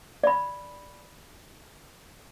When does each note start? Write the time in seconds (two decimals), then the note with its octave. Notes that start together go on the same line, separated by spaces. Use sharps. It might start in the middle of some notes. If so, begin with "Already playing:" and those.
0.24 D5 B5